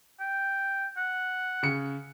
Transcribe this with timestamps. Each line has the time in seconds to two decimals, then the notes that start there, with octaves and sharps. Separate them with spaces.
0.20 G5
0.97 F#5
1.63 C#3 C#7